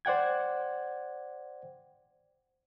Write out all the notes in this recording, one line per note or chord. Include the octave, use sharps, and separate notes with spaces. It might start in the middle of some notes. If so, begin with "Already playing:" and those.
C5 D5 F#5 G5 G#6